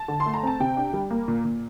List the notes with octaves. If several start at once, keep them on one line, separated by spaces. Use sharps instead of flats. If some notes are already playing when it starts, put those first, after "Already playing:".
Already playing: A5
D3
C6
A3
A#5
C4 A5
C3 G5
D4
G3
A#3
A#2
A#2